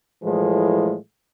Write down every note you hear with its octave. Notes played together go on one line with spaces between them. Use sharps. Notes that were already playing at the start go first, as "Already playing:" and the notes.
A2 E3 F3 G#3 A3